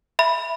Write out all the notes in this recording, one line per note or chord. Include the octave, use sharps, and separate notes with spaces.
E5 B5